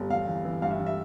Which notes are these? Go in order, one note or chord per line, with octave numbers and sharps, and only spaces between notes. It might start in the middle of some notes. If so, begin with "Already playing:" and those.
Already playing: G1
E2 F5
E3
E3
G2 F5
E5
E3
E5